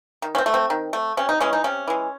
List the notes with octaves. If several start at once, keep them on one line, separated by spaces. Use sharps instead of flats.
D#3
C#4
C4
A3
C4
D#3
A3
C3 C#4
D#4
E3 G#3 C#4
D#4
C3 C#4
E3 G#3